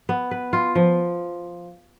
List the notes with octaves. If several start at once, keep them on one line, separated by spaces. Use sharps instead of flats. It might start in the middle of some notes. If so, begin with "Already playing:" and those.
B3
B4
F4
F3